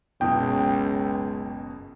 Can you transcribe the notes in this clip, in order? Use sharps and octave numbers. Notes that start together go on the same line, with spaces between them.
F#1 C#2 B2 G5 A5